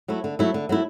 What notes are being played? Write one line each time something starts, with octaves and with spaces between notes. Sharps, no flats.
F#3 A3 E4
D3
F#3 A3 E4
D3
F#3 A3 E4